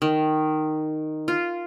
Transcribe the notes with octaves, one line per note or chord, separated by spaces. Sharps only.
D#3
F4